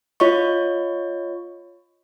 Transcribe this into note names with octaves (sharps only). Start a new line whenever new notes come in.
F4 C#5 D#5 C#6